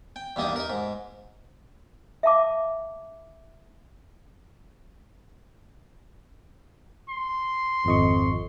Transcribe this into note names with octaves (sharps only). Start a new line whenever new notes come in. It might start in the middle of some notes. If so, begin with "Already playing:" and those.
G5
E2 G2 A#3 D#4 D#5
D#4 A#4
G#2
E5 F5 A5 D6
C6
G#1 F2 D#5 C#6